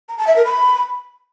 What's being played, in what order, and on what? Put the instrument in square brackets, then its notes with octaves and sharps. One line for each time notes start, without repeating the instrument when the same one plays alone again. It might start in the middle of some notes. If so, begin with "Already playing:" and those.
[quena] A#5
A5
E5
A#4
B5